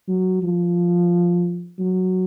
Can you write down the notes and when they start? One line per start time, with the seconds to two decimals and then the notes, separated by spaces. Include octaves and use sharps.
0.08 F#3
0.43 F3
1.79 F#3